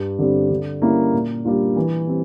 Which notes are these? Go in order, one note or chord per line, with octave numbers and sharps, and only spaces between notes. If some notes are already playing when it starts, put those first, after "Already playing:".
Already playing: G2
D3 G3 C4
D3
G3 A#3 C#4 E4
A#2
G3 A#3 D4 F4
E3
G3 C4